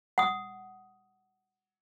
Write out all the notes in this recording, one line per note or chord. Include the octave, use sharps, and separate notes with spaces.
F#5 D#6